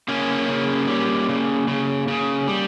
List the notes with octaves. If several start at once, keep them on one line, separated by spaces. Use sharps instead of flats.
C#3 A#3 C#4
C#3
G3
C#3
C#3
C#3
G3